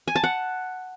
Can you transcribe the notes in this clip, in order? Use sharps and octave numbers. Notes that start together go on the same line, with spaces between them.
G#5
A5
F#5